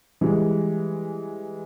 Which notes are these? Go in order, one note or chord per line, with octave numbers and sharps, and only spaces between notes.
E3 G3 G#3